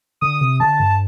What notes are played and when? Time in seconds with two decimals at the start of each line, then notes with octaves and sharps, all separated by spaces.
0.21 D3 D#6
0.41 C3
0.60 D3 A5
0.79 G2